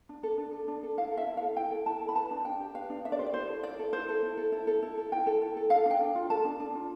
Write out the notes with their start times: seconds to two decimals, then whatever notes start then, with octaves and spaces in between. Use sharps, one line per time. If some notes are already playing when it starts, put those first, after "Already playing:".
0.09 D4
0.23 A4
0.38 D4
0.53 A4
0.68 D4
0.83 A4
0.97 E4 F5
1.12 A4
1.17 E5
1.27 E4
1.37 F5
1.42 A4
1.56 E4 G5
1.71 A4
1.86 E4 A5
2.02 A4
2.09 B5
2.16 B4 A5
2.31 D4
2.45 D4 G5
2.60 G4
2.75 B4 F5
2.90 D4
3.05 D4 E5
3.12 D5
3.19 G4 C5
3.26 D5
3.34 E4 C5
3.49 A4
3.63 E4 D5
3.79 A4
3.93 E4 C5
4.09 A4
4.23 E4
4.37 A4
4.52 E4
4.67 A4
4.82 E4
4.98 A4
5.12 E4 G5
5.26 A4
5.42 E4
5.56 A4
5.70 A4 F5
5.86 D4
5.91 G5
6.01 D4
6.15 F4
6.30 A4 A5
6.45 D4
6.60 D4
6.75 F4